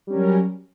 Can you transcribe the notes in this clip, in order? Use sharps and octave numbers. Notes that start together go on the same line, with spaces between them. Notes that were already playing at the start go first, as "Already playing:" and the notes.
F#3 G3 C#4 A#4